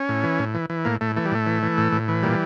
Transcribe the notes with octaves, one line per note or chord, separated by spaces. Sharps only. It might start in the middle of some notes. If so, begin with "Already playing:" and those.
Already playing: C#4
A2
E3
A2
E3
E3
A2 A#3
A2 A3
E3 A3
G3
A2 A3
E3
E3
A2
A2
E3
A#2 G3